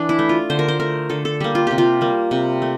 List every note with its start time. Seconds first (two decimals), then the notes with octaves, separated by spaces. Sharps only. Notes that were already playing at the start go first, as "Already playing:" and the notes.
Already playing: E3 D4
0.09 E4
0.19 A3
0.29 F4
0.50 D3 C5
0.59 A#4
0.68 C5
0.80 A3 A#4
1.10 D3 A4
1.25 A4
1.40 G3 A#3 G4
1.55 F4
1.67 C3 G4
1.78 F4
2.01 G3 A#3
2.31 C3
2.62 A3